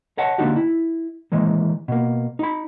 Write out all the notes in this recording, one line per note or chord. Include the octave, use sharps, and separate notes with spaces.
C#5 D#5 F#5 A5
D3 A#3 D4 D#4 F#4 G4
E4
D#3 E3 G#3 A#3
B2 A#3
D#4 B5